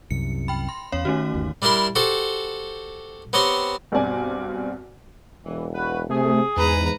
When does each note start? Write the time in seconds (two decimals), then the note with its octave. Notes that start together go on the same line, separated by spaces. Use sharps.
0.10 C2 F#2 C3 C#7
0.48 G5 B5
0.69 C6
0.92 E2 C#4 C#5 F5
1.05 D#3 A3 C#4 F#4
1.34 G1 D#2 D#3
1.62 G3 D4 E4 A#4 C6
1.95 F#4 G4 A4 C5
3.33 B3 C4 G4 C#5 A#5 C6
3.92 B1 G2 B2 C4 D5 G#5
5.44 E1 E3
5.74 F#4 B4
6.09 C3 A3 G#4
6.57 E2 G#2 B4 A#5